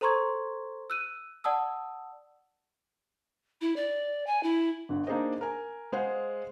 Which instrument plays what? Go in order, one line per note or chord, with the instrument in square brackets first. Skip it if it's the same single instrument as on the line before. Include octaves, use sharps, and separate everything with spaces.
[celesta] A4 C5 A#5 C6 C#6 G#6
E6 F#6 D#7
D5 F#5 A5 D#6 E6
[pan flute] E4
D5
G#5
E4
[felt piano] G1 D3
A#3 D4 D#4 G#4 C5 D#5
A#4 G#5
G#3 G#4 C5 F5 F#5